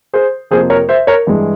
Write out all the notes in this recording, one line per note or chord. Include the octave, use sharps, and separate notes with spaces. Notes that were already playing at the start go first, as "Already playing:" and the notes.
G#4 C5
F2 C3 F3 A#3 G#4 C5
A#4 C#5
C5 E5
A#4 C#5
G2 E3 G#3